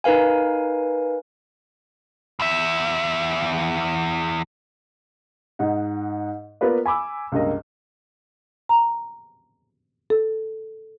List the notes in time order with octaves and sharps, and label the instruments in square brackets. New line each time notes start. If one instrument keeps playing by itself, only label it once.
[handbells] D#4 A#4 B4 F5 G#5
[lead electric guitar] E2 E5
[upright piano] G#2 D#4 F#5
A#3 B3 F4 A#4 B4 D5
G#5 B5 D6 E6
C#2 G2 A#3 D#5
[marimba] A#5
A4